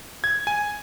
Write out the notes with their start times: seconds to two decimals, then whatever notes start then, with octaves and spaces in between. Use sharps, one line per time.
0.24 G#6
0.47 G#5